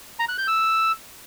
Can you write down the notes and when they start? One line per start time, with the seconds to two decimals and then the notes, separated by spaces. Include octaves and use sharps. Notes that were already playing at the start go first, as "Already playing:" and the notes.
0.19 A#5
0.29 F#6
0.38 G6
0.48 E6